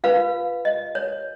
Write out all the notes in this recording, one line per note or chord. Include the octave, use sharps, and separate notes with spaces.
F4 B4 F5
D#5
C#5